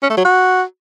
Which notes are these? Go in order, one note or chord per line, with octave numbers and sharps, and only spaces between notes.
C#4
A3
F#3
F#4